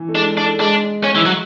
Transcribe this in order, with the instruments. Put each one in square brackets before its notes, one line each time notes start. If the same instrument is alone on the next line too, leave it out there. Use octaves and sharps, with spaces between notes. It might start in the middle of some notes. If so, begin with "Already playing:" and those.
Already playing: [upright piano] E3
A3
[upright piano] G#3 [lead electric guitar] D4
[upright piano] A3
[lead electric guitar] D4
[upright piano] A3
[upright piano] G#3 [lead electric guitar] D4
[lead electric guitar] C#4
E3
F#3